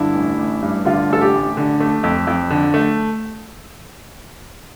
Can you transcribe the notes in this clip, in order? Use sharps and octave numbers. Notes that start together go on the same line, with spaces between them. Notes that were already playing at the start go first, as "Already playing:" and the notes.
Already playing: G2 D3 E4
A1
A1
G2
D3 F4
A1 A4
G4
A1
D3
A3
F2
F2
D3
A3